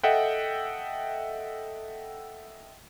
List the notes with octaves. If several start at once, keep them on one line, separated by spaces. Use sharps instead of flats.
A4 D#5 E5 F#5 G5